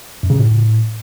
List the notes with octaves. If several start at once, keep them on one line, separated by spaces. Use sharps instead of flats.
F#2
C#3
A2